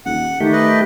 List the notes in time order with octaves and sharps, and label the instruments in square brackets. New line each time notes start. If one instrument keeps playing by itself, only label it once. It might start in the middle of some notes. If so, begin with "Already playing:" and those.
[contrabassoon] D#1 [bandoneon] F#5
[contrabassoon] D#3 [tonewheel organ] A3 G4
[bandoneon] B4 D#5